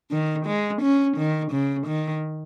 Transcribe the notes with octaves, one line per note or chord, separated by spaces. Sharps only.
D#3
G#3
C#4
D#3
C#3
D#3